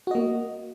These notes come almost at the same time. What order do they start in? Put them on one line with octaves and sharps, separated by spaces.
F#4 D#5 A#3